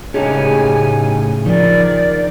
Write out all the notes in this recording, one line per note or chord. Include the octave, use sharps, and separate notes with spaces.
A2 C#3 C#4 D#4 G4 G#4 G#5
D#3 F3 D5